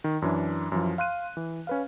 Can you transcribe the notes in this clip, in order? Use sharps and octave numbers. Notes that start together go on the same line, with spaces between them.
D#3
F#2 E3 D4
F#2 E3 F3
F5 C6 F#6 D#7
E3
C#4 B4 F5